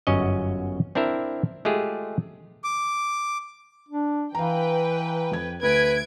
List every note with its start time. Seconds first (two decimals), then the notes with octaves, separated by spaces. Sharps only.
0.07 G1 F#2 C#4 F#4 D#5
0.95 C4 D4 E4 A#4 E5
1.65 G#3 A3 F4 G4 G#4
2.64 D6
3.89 D4
4.35 E3 B4 F5 G5 A#5
5.32 F2 G#6
5.63 D2 B4 G#6 D7